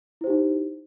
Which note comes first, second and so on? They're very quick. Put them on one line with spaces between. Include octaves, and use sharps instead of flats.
E4 C5 G4 D#4